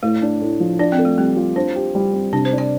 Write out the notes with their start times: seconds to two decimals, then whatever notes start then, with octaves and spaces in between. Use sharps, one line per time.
0.03 A2 A3
0.22 D4
0.41 A2
0.60 F3
0.79 D4 D5
0.92 C4
0.99 A4
1.05 A3
1.18 G3 C4
1.36 F4
1.56 D4 C5
1.76 G4
1.95 G3
2.13 C4
2.33 C3 D4
2.45 C5
2.53 D4
2.58 D5